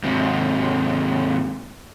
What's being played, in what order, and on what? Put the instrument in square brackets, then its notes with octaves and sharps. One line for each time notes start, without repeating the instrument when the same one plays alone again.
[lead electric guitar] G#2 C3